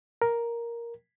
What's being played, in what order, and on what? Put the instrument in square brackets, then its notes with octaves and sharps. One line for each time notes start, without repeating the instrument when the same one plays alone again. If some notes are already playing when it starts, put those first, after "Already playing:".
[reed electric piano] A#4